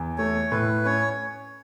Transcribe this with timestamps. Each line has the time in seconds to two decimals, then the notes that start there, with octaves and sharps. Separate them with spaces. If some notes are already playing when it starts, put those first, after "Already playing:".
Already playing: E2
0.18 A3 C#5
0.52 A2 B4
0.85 C#4 C#5